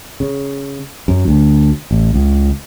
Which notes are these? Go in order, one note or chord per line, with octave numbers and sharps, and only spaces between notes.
C#3
F#2
D2
A1
C#2